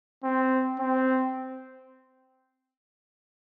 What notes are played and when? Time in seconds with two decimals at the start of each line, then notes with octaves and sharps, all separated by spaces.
0.24 C4
0.79 C4